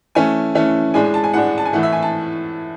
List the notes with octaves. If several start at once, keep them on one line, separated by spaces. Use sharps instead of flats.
E3 A3 C#4 G#5
E3 A3 C#4
A2 G#3 D4 G#5
G#5
A5
G#5
A2 G#3 D4 F#5
A5
G#5
A2 E3 A3 F#5
E5
G#5
A5